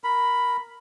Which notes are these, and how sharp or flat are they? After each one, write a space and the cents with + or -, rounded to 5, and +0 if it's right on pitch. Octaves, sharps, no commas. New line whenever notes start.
A#4 +0 B5 +0